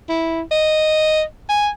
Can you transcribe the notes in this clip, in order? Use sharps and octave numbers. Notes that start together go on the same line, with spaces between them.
E4
D#5
G#5